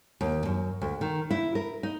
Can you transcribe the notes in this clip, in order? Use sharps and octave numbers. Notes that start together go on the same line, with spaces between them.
D#2
F#2
D2
D#3
E4
A#4
D#4